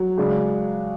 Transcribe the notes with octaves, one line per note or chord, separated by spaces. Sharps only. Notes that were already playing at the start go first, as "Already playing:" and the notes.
Already playing: F#3
C#3 G#3 D4